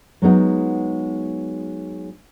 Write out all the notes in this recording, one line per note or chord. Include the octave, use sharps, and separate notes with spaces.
F#3 G#3 B3 D#4